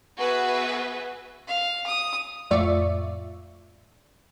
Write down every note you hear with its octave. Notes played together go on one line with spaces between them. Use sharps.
B3 F#4 G#4 B4 E5
F5
D#6
F2 A2 F4 D5 E5 C#6